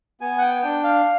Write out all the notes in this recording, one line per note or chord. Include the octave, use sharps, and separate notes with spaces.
B3 G#5
F#5
G5
D4 G5
F5